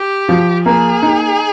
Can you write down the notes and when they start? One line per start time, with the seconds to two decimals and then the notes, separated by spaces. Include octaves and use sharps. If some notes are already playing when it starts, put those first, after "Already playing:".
Already playing: G4
0.29 F3
0.65 A#3 G#4
1.02 D#4